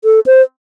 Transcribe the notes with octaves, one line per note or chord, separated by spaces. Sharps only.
A4
C5